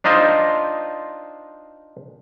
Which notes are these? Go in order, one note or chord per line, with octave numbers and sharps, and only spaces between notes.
D4 D#4 F4 C5 D#5